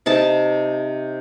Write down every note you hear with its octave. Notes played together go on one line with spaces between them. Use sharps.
C3 D#4 A5